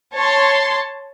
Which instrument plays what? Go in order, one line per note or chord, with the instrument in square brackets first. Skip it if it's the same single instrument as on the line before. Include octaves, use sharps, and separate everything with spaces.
[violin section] C#5 A5 C6